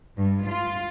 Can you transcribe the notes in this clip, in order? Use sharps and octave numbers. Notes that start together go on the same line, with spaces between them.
G2
F4